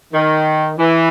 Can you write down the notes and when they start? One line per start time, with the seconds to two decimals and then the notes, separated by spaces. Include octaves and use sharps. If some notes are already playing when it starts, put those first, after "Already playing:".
0.13 D#3
0.79 E3